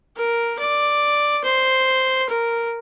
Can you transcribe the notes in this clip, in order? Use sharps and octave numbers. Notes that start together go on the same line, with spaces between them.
A#4
D5
C5
A#4